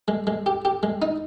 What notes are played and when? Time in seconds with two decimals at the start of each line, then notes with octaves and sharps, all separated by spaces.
0.08 G#3
0.27 G#3
0.46 G4
0.65 G4
0.83 G#3
1.02 D#4